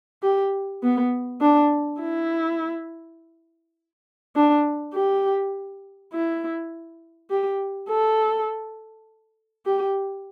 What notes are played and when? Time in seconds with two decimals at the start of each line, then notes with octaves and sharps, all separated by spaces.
0.23 G4
0.83 B3
1.41 D4
2.00 E4
4.36 D4
4.94 G4
6.13 E4
7.30 G4
7.89 A4
9.65 G4